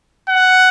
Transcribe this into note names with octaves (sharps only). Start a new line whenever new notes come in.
F#5